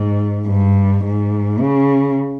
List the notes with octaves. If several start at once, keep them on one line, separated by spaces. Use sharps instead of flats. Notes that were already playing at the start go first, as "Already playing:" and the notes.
Already playing: G#2
G2
G#2
C#3